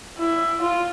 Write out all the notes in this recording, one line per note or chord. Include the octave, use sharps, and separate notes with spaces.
E4
F4